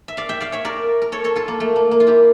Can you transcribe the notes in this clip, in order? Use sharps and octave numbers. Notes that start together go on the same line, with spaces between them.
E5
D5 F5
E5 G5
D5 F5
C#5 E5
A#4 D5
A#4
A4 C#5
A4 C#5
F4 A4
A#3
A3
A#3
A#3
F4
E4 G4